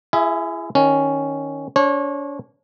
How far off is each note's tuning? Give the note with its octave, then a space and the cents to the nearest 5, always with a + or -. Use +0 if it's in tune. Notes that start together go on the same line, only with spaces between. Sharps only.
E4 +35 G#4 +0 E5 -15
D#3 +0 C#4 +0
D4 -40 C#5 -30